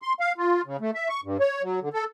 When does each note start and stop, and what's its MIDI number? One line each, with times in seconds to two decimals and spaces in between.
0.02 0.13 84
0.20 0.32 77
0.38 0.62 65
0.65 0.77 49
0.81 0.91 57
0.94 1.09 76
1.09 1.21 85
1.24 1.37 43
1.40 1.62 73
1.63 1.80 54
1.81 1.89 50
1.93 2.04 69